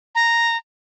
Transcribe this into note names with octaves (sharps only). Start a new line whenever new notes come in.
A#5